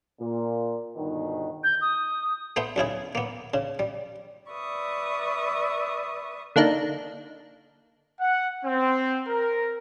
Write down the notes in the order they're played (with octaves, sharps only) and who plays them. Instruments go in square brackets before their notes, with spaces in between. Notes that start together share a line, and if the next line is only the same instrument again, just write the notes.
[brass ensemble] A#2
G1 B2 D#3
[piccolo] G6
D#6
[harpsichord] A3 B3 C5 E5 C6
B1 C#3 E4 G#4
A#3 B3
C#3
G3
[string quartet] B4 D5 E5 C#6 D#6
[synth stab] D3 A#3 D4 D#4
[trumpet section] F#5
C4
A#4